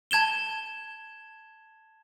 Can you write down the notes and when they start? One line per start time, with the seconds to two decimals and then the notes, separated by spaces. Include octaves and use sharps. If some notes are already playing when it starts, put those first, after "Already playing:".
0.11 A5 G#6 E7 G7